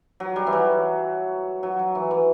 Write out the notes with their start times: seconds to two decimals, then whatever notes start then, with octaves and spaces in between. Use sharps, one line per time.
0.20 F#3
0.36 G3
0.47 E3
0.52 F#3
1.63 F#3
1.79 F#3
1.95 E3
2.11 E3